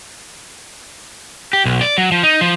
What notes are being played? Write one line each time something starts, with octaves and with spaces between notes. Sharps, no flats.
G4
B1
D5
F#3
F3
D#4
F3